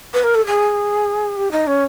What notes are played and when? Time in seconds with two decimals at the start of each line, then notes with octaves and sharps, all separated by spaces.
0.13 B4
0.23 A#4
0.34 A4
0.46 G#4
1.36 G4
1.51 D#4
1.67 C#4